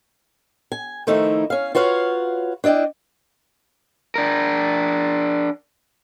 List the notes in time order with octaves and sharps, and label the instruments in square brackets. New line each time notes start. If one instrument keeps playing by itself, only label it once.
[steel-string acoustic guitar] G#5
D#3 F3 A3 D#4 E4
C#4 F5
F4 F#4 B4 C#5 F5
D4 E4 D5 D#5 G5
[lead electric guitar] D4 A#4